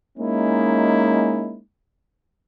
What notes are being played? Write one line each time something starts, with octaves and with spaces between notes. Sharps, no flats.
G#3 A#3 C#4 D#4 E4